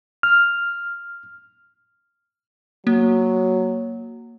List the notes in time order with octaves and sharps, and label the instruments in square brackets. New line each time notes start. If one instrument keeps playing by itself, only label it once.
[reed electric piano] F6
[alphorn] F#3 [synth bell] A#3